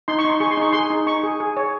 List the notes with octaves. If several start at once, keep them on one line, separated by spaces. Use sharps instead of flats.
D#4 C6
C#6
D#4
C6
G#4 C#6
C6
D#4 C#6
G#4 C6
D#4
D#4 C#6
G#4
G#4
C#5